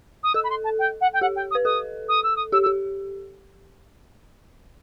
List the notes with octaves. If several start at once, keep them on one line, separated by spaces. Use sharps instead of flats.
D#6
A4 E6
B5
C6
A5
G5
F#5
G5
G4 F#5
G5
D#6
B4
A4 D#6
D#6
E6
D#6
G4 E6
E6
G4